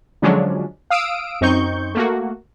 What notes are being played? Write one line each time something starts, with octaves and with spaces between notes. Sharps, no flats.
D3 F3 F#3 G#3 C#4 D4
F5 D#6 E6 D7
F#2 C4 D#4 C#6 G6
A3 A#3 F#4